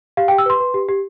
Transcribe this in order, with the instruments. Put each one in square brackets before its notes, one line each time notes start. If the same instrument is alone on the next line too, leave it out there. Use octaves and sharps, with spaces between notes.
[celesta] G4 F5
G5
G4
E6
B4 C6
B4
G4
G4